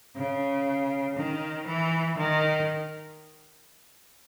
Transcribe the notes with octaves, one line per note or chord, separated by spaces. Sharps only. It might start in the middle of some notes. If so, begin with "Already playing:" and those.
C#3
D#3
E3
D#3